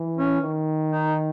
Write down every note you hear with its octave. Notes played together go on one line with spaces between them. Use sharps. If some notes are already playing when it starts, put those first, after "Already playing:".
Already playing: E3
C#4
D#3
D#4